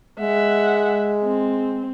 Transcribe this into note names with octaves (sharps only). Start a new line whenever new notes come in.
G#3 E5 F#5
C4